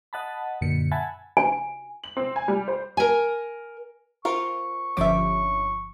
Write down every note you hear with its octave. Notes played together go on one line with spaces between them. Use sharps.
D#5 F#5 A5 B5
F#2 A#2 D3 C#7
E5 F#5 G#5 A5 B5
G#5
F#7
C4
G#5
G3
C5
A#4 G#5
C4 F4 A#4 F5 C#6
G1 F3 C#4 E5 D6